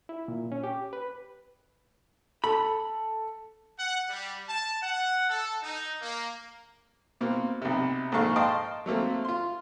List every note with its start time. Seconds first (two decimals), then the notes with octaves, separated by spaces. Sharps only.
0.09 E4
0.28 A#2
0.52 C#4
0.64 G4
0.93 B4
2.44 A4 B5
3.79 F#5
4.10 G3
4.49 A5
4.82 F#5
5.29 A4
5.63 D#4
6.02 A#3
7.21 B2 A#3 C4
7.62 B1 C3
8.12 A#1 G#2 A4 F5 C#6
8.36 C5 D#5 F5 G5 A5 C#6
8.86 F#3 A3 A#3 C4
9.25 F4 C6